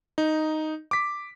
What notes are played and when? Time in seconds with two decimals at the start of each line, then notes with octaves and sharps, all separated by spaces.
0.18 D#4
0.91 D6 B6